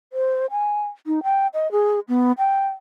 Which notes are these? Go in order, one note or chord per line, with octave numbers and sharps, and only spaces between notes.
C5
G#5
D#4
G5
D#5
G#4
B3
G5